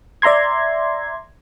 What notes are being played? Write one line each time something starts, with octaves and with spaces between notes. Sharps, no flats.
D5 E5 A#5 C6 G#6